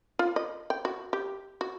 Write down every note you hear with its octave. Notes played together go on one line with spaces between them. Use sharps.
F4
D#5
G5
F#4
G4
F#4